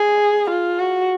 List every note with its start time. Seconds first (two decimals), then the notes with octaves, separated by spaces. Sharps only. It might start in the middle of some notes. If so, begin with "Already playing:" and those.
Already playing: G#4
0.50 F4
0.80 F#4